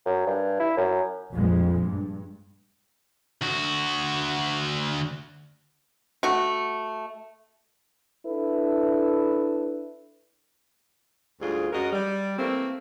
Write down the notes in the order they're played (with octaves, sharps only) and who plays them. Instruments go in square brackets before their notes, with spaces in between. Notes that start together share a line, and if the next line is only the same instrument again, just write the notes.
[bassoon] F#2
G2
E4
F#2
[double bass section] A#1 F2 G#3
G2
[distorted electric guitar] D2 F#4
[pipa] A3 F#4
[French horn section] D4 E4 A4 B4
[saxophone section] D2 G#2 G3 F4 G#4
F#2 G#3 F#4 A#4 D#5
G3
E3 A3 A#3 C4